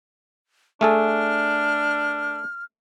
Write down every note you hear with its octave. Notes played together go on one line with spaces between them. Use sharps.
A3 D4 G#4 A4 F6